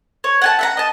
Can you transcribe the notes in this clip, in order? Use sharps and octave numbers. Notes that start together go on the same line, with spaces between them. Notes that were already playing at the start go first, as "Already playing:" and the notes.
C#5
F#5 G#5 A5
E5 F#5 A#5
D#5 A5